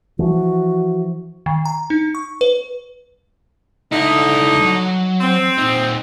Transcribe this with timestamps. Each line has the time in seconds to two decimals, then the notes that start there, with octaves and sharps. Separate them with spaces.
0.19 E3 F3 F#4
1.46 D#3
1.65 A#5
1.90 D#4
2.15 C#6
2.41 B4
3.92 C#2 D3 D#4 E4
4.62 F#3
5.21 C4
5.58 A#2 D#4